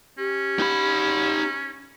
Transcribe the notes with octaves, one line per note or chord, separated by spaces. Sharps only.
C#4 G4
D#4 B5